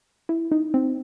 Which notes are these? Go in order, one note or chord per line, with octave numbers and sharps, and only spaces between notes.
E4
D#4
C4